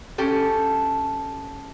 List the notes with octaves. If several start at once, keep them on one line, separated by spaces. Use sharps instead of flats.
C#4 G4 A4